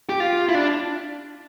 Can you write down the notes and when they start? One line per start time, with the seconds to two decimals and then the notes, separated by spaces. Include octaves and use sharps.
0.09 G4
0.20 F4
0.49 E4
0.55 D4